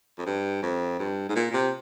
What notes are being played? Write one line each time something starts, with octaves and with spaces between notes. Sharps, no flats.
F2
G2
F2
G2
G#2
A#2
A#2
C3